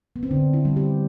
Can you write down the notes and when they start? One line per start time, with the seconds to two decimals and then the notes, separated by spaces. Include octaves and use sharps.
0.16 B3
0.23 C4
0.31 D3 D4
0.54 E4
0.65 G3
0.77 G4